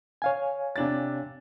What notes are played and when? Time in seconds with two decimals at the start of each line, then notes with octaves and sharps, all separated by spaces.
0.22 C#5 F5 G#5
0.76 C3 D4 A6